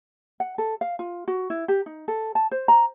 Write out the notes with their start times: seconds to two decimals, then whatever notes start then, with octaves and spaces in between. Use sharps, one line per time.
0.40 F#5
0.58 A4
0.81 F5
0.99 F4
1.28 F#4
1.50 E4
1.68 G4
1.86 D#4
2.08 A4
2.35 A5
2.51 C5
2.68 A#5